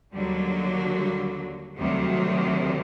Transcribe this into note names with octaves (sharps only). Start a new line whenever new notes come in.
D#2 D3 F#3 G3
G3
D2 C3 D#3 F#3 G3